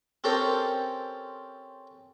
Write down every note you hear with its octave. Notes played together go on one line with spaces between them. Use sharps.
C4 C#4 G4 A4 A#4 C5